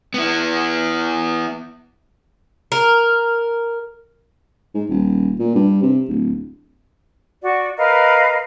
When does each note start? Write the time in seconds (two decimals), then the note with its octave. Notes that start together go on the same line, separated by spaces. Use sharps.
0.14 B3 E4
2.72 A#4
4.74 G#2
4.89 D#1
5.39 A#2
5.55 G2
5.82 C3
6.08 D1
7.42 F#4 D5
7.78 A#4 B4 D#5 F5